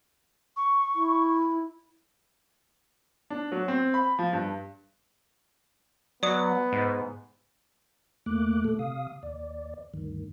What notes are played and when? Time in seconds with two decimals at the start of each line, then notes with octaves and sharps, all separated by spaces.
0.57 C#6
0.95 E4
3.30 D4
3.52 F#3
3.68 C4
3.94 B5
4.19 F3
4.33 G2
6.23 F#3 B3 D5 D#6
6.73 G#2
8.26 E2 A3 A#3 D6 F#6
8.65 A#2 A3 A4
8.79 C3 F5 D#6
9.23 D#2 D5
9.94 D2 G2 D#3